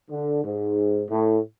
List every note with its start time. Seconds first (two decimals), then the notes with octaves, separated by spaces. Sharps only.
0.10 D3
0.44 G#2
1.09 A2